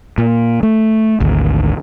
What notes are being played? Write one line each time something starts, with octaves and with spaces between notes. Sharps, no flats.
A#2
A3
G#1 D2